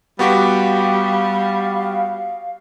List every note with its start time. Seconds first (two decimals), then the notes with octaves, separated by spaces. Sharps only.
0.19 G3 B3 F#4 G4 F5
0.79 F5